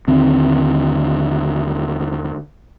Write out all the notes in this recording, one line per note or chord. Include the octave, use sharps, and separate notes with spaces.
D#2 D3 D#3 C4